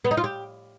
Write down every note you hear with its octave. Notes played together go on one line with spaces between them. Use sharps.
B3
D#4
F4
G4